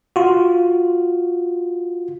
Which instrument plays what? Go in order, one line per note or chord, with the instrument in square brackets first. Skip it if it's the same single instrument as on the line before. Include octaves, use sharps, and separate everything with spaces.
[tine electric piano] F4 F#4